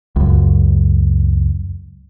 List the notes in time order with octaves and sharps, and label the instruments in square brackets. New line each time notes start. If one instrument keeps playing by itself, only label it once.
[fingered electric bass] C#2 F#2